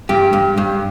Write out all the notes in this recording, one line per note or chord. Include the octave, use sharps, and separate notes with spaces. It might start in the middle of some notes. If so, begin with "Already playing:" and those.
G2 G4
G2
G2